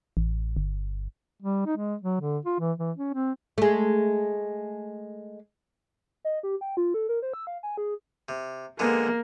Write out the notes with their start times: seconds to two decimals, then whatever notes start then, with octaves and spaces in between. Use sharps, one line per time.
0.17 A1
0.57 G1
1.42 G3
1.66 D#4
1.77 G#3
2.02 F#3
2.21 D3
2.46 F4
2.59 E3
2.78 E3
2.97 C#4
3.14 C4
3.58 G#3 A3
6.25 D#5
6.43 G4
6.61 G5
6.77 F4
6.94 A4
7.09 A#4
7.22 C5
7.34 E6
7.47 F5
7.63 G#5
7.77 G#4
8.29 C3
8.79 D3 G#3 A#3 B3